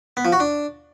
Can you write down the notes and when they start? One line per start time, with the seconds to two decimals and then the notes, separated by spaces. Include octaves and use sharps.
0.17 B3
0.25 F3
0.32 F#4
0.40 D4